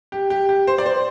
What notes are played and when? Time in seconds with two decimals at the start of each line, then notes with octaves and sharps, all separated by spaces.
0.12 G4
0.30 G4
0.49 G4
0.67 C5
0.78 D5
0.86 C5